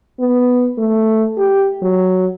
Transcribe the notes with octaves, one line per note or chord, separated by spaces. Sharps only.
B3
A3
G4
F#3